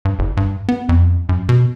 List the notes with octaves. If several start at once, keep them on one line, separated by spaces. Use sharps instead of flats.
G2
F#1
G2
B3
F2
F#2
B2